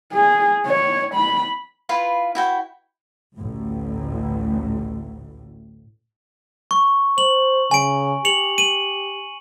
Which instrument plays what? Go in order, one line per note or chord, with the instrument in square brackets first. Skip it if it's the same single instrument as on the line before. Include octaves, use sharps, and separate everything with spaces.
[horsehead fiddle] G#4
C#5
B5
[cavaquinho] E4 F4 B4 F5
E4 F#4 G5
[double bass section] A1 D2 A2
[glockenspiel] C#6
[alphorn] C5 [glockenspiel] F#7
[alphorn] C#3 [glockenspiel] G#5 D7
[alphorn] G4 [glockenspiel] C#7 F7 F#7
[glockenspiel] D#7 F#7